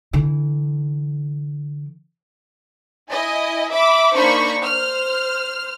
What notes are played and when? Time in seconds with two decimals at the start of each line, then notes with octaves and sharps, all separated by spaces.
0.13 D3 E3
3.10 E4 D#5 G#5
3.71 E5 B5 D6
4.14 A#3 D4 D#4 C5 B5 C#6
4.63 C5 F6